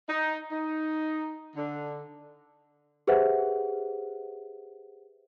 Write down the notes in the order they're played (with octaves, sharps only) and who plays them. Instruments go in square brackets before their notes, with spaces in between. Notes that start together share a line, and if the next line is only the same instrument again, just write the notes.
[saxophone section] D#4
D#4
D3
[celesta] G4 G#4 B4 C5 E5 F#5